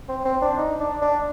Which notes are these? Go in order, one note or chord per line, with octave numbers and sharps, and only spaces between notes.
C4
C4
D4
D#4
D4
D4